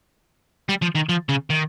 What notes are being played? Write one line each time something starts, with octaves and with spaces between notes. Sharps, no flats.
G3
F3
D#3
F3
C#3
D#3